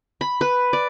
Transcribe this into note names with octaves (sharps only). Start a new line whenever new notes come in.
B5
B4
D5